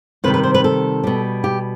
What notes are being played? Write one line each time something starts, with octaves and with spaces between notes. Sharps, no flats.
C3 D#3 G3 B4
B4
C5
B4
A4
B2 G3
G4